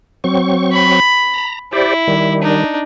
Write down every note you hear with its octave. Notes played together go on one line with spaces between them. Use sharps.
F#3 C4 C#6
B5
A#5
E4 G4 C5 D5
D#3 G3
D4 D#4